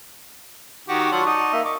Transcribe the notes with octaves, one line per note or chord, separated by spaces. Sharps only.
D#3 F#4 G4
F#3 F4 D5 F#5 A5 C#6
D#4
A#3 E5
D#5 C#6 D6